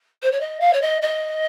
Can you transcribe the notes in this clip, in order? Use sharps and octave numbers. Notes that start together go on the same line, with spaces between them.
C5
C#5
D#5
F5
C#5
D#5
D#5